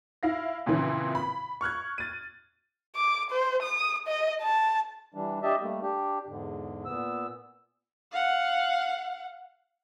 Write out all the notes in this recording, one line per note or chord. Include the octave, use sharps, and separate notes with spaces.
E4 F5 A#6
F2 A#2 C#3 E3
B5
C#6 F6 F#6 G#6
A6 D#7
D6
C5
D#6
D#5
A5
E3 G3 D4
D4 G4 D#5 E5 A5
G3 A3 A#3
D4 G4
E2 G#2 D3
A#2 B3 E6
F5 F#5